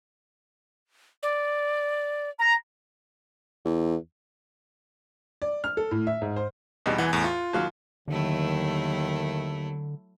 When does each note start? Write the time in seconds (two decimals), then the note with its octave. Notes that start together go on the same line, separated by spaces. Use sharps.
1.23 D5
2.39 A#5
3.65 E2
5.42 D5
5.64 F6
5.77 A4
5.91 A2
6.07 E5
6.22 G#2
6.36 C5
6.86 E2 B2 G3 D#4
6.98 E2 E3 F#5 G#5
7.13 E2 A2
7.24 F4
7.53 D#2 F#3 F5
8.08 D#2 D3 D#3 F#3 A3 E4